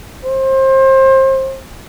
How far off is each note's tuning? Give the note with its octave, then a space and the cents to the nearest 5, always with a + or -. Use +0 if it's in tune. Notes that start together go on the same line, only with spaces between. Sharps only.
C5 +30